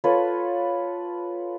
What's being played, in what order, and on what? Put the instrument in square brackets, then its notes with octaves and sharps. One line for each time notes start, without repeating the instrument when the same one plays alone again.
[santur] F4 A4 B4 C#5